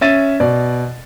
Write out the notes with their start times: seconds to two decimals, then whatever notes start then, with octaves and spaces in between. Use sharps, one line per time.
0.01 C#4 E5 A6 D#7
0.40 B2 D5